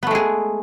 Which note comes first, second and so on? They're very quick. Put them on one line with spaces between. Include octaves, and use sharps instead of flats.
B3 A3 G#3 G#4